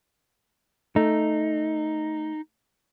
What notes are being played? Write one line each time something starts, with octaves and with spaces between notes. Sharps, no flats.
A3 D#4